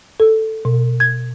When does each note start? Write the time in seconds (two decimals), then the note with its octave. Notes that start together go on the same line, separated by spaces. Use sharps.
0.20 A4
0.65 B2
1.00 G#6